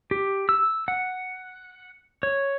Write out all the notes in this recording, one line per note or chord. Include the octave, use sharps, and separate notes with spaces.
G4
E6
F#5
C#5